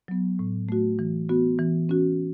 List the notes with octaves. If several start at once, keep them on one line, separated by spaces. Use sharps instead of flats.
F#3 B3
A2
A3 F#4
E3
B3 F#4
E3
C#4 F#4